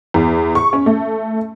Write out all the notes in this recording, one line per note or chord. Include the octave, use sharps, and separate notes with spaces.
E2
C#6
C#4
A3